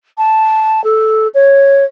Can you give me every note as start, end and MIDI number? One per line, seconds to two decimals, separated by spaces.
0.18 0.84 81
0.84 1.28 69
1.34 1.85 73